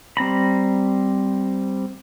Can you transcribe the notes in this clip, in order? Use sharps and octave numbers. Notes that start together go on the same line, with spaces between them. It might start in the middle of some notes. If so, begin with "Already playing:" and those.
G3 C4 A#5 B5